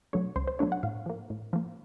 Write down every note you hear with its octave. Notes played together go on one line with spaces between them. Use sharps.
B2 F#3 A3 D4 C#5
C#2 C5
C5
B2 F#3 A3 D4 C#5
F#5
A2 F5
F3 A#3
A2
F3 A#3